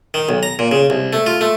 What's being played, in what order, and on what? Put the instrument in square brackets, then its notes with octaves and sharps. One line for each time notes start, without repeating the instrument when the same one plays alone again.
[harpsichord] D#3
B1
A#5
A#2
C#3
C2
A3
F4
A3